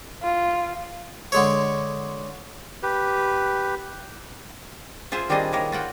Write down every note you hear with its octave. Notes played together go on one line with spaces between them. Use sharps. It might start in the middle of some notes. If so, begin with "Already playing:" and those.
F4
D3 G#3 C#5
G4 B4
F4 G#4 C5 E5
D#3 G3 C4 D4 G#4 D#5
D#3 A#3 A#4 C#5
F4 F#4 F#5 G5